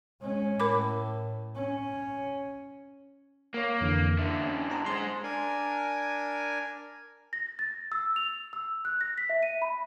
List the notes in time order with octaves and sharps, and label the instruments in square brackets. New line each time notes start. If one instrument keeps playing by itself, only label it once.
[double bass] G#3 C#4
[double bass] A2 [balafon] A#4 B5 D6
[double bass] C#4
[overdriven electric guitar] A#3 [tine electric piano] C#5 F5
[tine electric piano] F2 D3 E3
[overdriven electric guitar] F#2 D3 [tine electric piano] E5
[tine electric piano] C#4
A5 A#5
[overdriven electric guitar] G#3 C5 [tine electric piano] C6
[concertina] D4 A#4 G#5
[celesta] A#6
A6
E6
F7
E6
F#6
A#6
B6
E5
D#7
B5